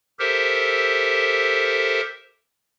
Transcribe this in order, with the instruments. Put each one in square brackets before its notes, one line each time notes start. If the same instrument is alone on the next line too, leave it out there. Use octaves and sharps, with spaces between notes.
[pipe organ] G4 A4 A#4 C5 E5